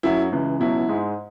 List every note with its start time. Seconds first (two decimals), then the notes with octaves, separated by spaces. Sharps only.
0.03 F#2 F#3 E4
0.32 C#2 C#3 E3
0.60 C#2 B2 F#3 E4
0.89 G#2 G#3